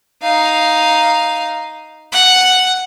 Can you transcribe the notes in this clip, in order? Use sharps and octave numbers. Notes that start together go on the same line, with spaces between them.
D#4 F5
F#5